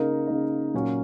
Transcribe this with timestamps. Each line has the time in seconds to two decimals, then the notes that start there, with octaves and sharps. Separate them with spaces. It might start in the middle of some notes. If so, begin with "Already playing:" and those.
Already playing: C#3 A#3 D#4 A#4
0.27 C#3 A#3 D#4
0.74 A#2 F#3 C#4